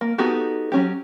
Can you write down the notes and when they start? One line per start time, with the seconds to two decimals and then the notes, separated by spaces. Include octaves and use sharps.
0.01 A#3
0.18 B3 D#4 F#4 G4 A4
0.72 F#3 C#4 G4